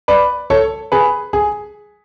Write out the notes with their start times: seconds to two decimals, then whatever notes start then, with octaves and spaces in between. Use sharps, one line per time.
0.08 B4 D5
0.50 A4 C#5
0.92 G#4 B4
1.33 G#4